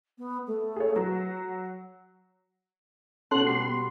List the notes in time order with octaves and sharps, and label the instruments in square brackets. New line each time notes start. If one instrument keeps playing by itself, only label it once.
[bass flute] B3
A3
[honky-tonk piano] G#4 C#5
[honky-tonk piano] F#3 [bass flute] B4
[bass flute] F#5
[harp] B2 F#4 C6 [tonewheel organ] C#4 A4 F#6
[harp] G3 B3 [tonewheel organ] C6